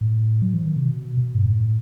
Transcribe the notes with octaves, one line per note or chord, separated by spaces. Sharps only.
A2
F#3
E3
D#3
C3
B2
B2
G2
A2